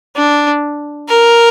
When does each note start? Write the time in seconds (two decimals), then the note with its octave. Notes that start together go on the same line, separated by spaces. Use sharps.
0.16 D4
1.09 A#4